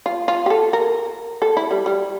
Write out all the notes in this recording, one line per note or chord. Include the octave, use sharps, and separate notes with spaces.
F4
F4
G4
A4
A#4
A4
E4
G3
G3